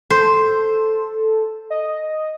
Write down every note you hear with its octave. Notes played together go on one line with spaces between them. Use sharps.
A4 C5
D#5